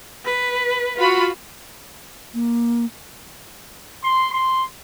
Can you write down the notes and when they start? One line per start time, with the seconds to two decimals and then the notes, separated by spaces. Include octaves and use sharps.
0.25 B4
0.97 F4 F#4 B5
2.34 A#3
4.04 C6
4.33 C6